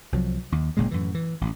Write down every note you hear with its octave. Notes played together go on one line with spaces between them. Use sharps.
C2 F3 F#3
D#2
F#1 A#2 C#3 G#3
F#2 A2 E3
E3
A1